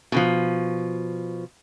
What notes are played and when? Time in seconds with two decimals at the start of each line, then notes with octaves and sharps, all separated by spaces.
0.12 B2 D#3 F3